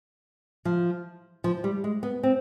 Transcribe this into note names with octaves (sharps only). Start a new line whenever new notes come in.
F3
F3
G3
G#3
B3
C4